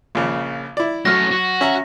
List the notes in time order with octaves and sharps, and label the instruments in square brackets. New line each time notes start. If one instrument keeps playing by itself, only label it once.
[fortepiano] A#1 C#3
E4 D5
[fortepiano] F#3 F6 [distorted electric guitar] A3 C#4 [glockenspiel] A#6
[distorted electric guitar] F#4
[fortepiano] C#4 E5 A#5